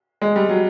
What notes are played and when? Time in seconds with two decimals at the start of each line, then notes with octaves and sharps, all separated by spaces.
0.22 G#3
0.36 G3
0.49 F#3